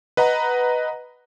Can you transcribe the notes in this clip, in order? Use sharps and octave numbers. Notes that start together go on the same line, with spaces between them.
B4 D#5 F#5 A#5